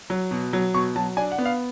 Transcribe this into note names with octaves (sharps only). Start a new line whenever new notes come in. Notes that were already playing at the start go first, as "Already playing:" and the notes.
F#3
B2
F#3
B2 C#6
F#3 A5
D4 G#5
F#5
B3
F5